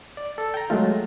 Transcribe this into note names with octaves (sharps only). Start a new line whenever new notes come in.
D5
A4
G5 A#5
F#3 G#3 A3 F4